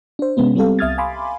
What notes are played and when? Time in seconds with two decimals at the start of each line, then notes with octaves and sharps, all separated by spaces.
0.19 D4 C5
0.37 C3 G#3 B3 C#4
0.55 G3 B3 C4 G4 A4 F5
0.79 C2 E5 D#6 F6 G#6 A6
0.98 F5 G#5 B5 C6 D6